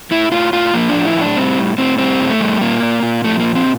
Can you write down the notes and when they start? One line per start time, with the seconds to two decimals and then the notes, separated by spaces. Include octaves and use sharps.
0.11 A2 E4
0.31 A2 F4
0.53 A2 F4
0.74 F3 A#3
0.89 D4
0.95 A2
1.05 E4
1.16 A2 D4
1.36 G3 C4
1.58 A2
1.78 A2 C4
1.98 G3 C4
2.20 A2
2.30 A3
2.41 G3
2.61 A#2 A#3
2.83 A#2
3.03 A#2
3.24 F3 A3
3.40 A#3
3.45 A#2
3.55 C4